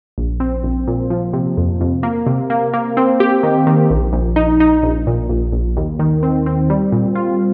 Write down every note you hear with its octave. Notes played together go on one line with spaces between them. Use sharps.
A#1
C4
A#1
A#2
F3
C3
F2
F2
A#3
C3
A#3
A#3
C4
G4
D#3
D#3
A#1
A#1
D#4
D#4
A#1
A#2
A#1
A#1
D#2
D#3
C4
C4
G3
A#2
F4